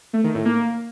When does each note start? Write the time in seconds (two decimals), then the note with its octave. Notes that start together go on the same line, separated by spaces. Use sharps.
0.13 A3
0.24 D#3
0.35 A2
0.45 A#3